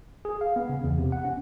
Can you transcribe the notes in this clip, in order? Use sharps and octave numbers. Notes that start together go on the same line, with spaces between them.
G#4
F5
B3
C#3
E2
C3
F#5
C#4